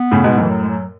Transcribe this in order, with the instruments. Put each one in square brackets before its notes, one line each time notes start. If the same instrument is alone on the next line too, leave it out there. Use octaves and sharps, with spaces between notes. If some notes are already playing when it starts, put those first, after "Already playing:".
Already playing: [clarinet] B3
[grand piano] A2 C#3
G#2 B2
[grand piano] F#2 A2 [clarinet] E3
[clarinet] F#3
G#3
F#3